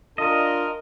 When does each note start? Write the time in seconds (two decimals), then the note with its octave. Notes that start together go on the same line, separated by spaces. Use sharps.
0.18 D4 F4 A#4 D#5